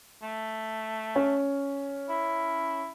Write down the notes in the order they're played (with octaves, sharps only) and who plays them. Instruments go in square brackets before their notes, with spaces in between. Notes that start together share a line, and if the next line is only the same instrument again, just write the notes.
[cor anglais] A3
[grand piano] C#4
[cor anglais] E4